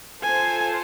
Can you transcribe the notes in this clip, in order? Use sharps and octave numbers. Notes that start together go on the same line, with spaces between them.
F4 A4 C5 G#5